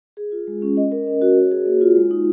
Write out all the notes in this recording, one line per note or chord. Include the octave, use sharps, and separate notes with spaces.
G#4
F4
G#3
C#4
D#5
A#4
C#4
F#4
C#5
G#4
A#3
F4
G#3
D#4